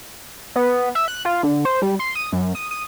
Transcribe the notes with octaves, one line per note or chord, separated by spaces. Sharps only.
B3
E5
F#6
F4
D3
C5
G3
C6
D#6
F#2
D#6
D#6